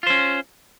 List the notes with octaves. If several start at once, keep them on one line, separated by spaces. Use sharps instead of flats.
C#4 F4 C5